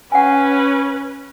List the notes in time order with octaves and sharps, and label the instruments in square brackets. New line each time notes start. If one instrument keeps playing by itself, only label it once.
[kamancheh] C#4 B4 [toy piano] F#5 G#5